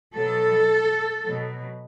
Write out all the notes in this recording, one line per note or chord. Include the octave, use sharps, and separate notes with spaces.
B2 F#3 A4
B2 F#3